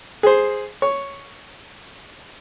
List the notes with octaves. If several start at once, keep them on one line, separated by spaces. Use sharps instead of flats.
G#4 C5
C#5